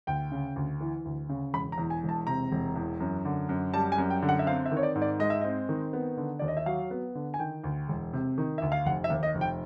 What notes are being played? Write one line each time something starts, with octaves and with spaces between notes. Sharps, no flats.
D2 G5
C#3
D2
E3
D2
C#3
E1 B5
A#5
E2
G#5
E1
A5
C3 A#5
E1
E2
F#2
D3
F#2
G3 A5
G#5
F#2
G5
D3
F#5
E5
C4 F5
E5
D#3
C#5
D5
G#2
D5
G#3 D#5
E5
C4 D#5
D#3
B3
D3
D#2 D5
D#5
E5
F#3 F5
B3
D3
G#5
D#3 G5
D2
E1
C3
D#3
D2 E5
F5
F1 F#5
E5
D#2
D#5
F1
G5